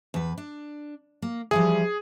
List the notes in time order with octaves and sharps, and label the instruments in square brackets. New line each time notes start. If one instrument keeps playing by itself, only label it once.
[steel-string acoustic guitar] E2 B4
D4
A#3
[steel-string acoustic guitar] E3 F3 G3 [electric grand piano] G#4